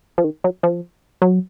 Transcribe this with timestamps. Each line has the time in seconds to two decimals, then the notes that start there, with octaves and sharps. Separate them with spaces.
0.18 F3
0.24 D#3
0.44 F#3
0.63 F3
1.22 F#3